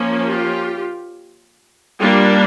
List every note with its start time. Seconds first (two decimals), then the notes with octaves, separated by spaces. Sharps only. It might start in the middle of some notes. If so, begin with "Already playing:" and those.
Already playing: F3 A#3 C#4
0.27 F4 G4
2.00 G3 A#3 D4 F4 G4